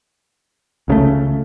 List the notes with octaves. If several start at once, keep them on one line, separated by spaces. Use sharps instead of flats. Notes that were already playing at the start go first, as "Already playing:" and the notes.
C#2 C#3 F#3 A3